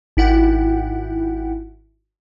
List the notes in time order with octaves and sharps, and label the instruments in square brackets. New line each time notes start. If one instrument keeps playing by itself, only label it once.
[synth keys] G#1 E4 F#5 G5